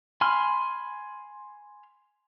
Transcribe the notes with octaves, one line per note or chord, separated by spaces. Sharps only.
G#5 B5 C6 F6